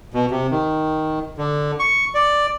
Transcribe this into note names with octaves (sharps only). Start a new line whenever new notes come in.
B2
C3
D#3
D3
C#6
D5